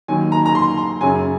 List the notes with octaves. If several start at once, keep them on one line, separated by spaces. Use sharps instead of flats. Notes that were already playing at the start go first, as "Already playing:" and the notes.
D#2 D#3 F#3 G#5
A#5
A#5
C6
A#5
F#2 C#3 F#3 C#4 G#5